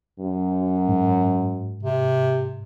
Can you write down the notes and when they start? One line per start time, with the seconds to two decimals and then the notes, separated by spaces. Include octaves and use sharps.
0.20 F#2
0.88 G#2
1.83 C3